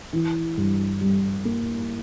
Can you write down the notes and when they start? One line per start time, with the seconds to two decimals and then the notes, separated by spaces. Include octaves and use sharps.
0.13 E3
0.57 G2
1.01 G3
1.45 A#3